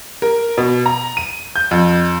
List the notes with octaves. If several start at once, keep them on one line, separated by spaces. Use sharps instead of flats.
A#4
B2
A#5
D#7
G6
F2